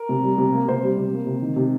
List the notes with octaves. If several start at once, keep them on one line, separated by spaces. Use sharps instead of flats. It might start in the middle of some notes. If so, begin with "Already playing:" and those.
Already playing: A#4
C3
G3
C3
A#3
C3 C5
G3
C3
A#3
C3
D#3
C3